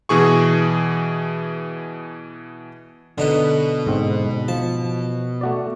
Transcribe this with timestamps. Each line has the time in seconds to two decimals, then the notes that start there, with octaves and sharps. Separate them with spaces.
0.09 B2 E3 G#4 C#6
3.18 B2 D3 D#4 B4
3.87 G#2 C4
4.48 F3 A5
5.41 A3 F#4 D5